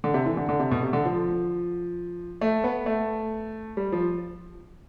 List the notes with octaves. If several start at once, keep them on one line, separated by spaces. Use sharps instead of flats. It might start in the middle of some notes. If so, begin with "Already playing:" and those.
D3
C3
E3
D3
D3
C3
B2
C3
D3
F3
A3
B3
A3
G3
F3